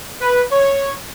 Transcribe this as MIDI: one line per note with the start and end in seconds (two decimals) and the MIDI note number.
0.21 0.42 71
0.52 0.93 73